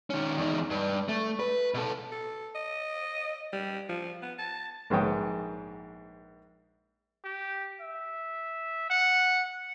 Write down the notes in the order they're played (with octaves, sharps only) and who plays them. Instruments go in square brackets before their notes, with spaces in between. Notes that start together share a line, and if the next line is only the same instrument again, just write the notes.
[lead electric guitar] D#3 C#4
E2 D#4
G2
A3
B4
B2 A4
[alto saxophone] A4
D#5
G3
F3
B3
A5
[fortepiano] A#1 G#2 B3 C#5 G5 D#6
[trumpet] G4
E5
F#5